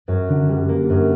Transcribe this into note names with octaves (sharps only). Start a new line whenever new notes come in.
F#2
D3
G3
A#3
F#2